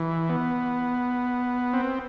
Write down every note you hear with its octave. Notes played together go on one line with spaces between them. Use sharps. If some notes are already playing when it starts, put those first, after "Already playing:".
Already playing: E3
B3
C4